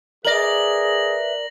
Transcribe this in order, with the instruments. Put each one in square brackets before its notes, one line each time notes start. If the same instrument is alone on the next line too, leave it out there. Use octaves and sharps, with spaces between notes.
[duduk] G#4 [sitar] A#4 D5 [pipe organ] B4 E5 [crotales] A#6 F#7